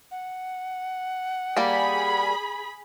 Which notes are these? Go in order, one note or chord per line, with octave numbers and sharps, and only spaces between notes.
F#5
G3 A#3 G#4 D5 B5